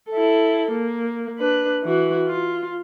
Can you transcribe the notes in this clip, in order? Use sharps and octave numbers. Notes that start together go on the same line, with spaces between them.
E4 A4
A#3
D4 B4
E3 F#4
F4